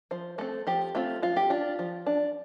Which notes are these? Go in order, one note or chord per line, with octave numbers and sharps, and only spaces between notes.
F3 C5
A3 C4 A4
F3 G4
A3 C4 F4
F3 F4
G4
D4 F4
F3
D4